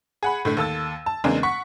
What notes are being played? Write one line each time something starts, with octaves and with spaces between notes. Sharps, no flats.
G#4 F#5 B5
A2 D3 A3
D#2 A4 E6 A6
A5
E2 C#3 G#3 A#3 C4 D4
F#5 C#6 B6